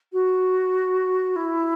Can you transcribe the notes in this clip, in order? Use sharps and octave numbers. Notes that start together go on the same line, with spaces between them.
F#4
E4